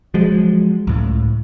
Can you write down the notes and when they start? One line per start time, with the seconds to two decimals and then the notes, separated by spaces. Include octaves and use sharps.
0.14 F3 F#3 G#3
0.87 C#2 A2